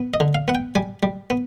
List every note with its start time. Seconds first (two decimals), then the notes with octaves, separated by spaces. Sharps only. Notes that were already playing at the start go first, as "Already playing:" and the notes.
Already playing: B3
0.14 D#5
0.20 D3
0.35 F5
0.48 B3 F#5
0.55 G5
0.75 G3 G#5
1.03 G3
1.30 B3